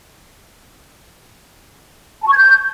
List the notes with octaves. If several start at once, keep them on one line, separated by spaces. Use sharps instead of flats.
A5
C#6
G#6
G6